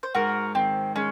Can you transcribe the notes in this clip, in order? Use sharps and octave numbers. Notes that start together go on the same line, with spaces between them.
C5
G#2 F#4 A#4
D#3 C4
G#3 C#4